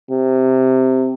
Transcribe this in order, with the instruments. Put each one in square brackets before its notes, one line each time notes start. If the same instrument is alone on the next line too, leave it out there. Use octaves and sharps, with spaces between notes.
[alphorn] C3